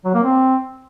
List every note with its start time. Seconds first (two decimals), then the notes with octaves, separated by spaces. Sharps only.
0.05 F#3
0.14 A#3
0.23 C4